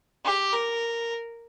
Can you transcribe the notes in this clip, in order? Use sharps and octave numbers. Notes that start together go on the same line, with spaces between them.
G4
A#4